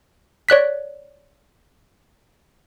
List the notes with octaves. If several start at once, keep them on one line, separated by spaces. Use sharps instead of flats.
C#5 D5 F#6 B6